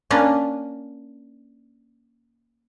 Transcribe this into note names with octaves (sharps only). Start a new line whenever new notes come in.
A#3 C#4 D4 B4